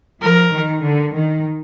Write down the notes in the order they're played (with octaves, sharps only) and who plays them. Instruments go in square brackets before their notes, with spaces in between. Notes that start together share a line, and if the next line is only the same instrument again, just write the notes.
[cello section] F3 [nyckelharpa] A#4
[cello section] D#3
D3
D#3